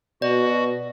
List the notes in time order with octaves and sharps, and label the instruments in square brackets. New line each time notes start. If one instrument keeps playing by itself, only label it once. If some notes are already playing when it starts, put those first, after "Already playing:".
[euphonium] B2 [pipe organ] F#4 [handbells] D5